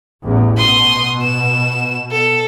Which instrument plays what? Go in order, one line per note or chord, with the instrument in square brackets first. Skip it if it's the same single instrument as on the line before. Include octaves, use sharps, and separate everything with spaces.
[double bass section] A1 E2
[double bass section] B2 [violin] C6 D#6
[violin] E7
A4